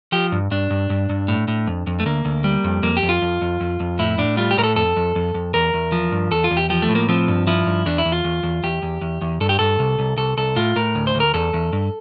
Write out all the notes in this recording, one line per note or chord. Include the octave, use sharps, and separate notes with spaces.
F3 G4
G2
G2 D4
G2
G2
G2
A2
A2
F2
F2
A3
D2 A#3
D2
G3
F2
F2 A#3
G4
F2
F4
F2
F2
F2
F2
A2 E4
A2 D4
G3 F4
G4
A2 A#4
A4
F2 A4
F2
F2
F2
E2 A#4
E2
F3
G2
E2 A4
F4
E2
G4
F3 G4
A3
A2
A#3
F3 C4
G2
F3 E4
G2
E2 D4
E4
E2
F4
E2
E2
E2 G4
E2
E2
E2
G2 A4
G4
G2 A4
C2
C2
C2 A4
C2 A4
A2 F4
A2 A#4
D2
C5
D2
A#4
E2 A4
E2
G2